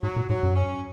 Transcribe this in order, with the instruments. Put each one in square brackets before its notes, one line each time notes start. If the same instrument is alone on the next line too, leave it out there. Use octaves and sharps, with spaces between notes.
[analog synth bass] G#2 [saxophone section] F#3
[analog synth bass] A#2
[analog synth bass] G#2 [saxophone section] F#3
[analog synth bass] F#2
[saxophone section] C#4